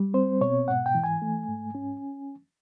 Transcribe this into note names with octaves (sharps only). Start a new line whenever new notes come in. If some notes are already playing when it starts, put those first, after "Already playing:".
Already playing: G3
C4 C5
B2 C#5
G#2 F#5
G5
E3
G#5
A3
G#2
C#4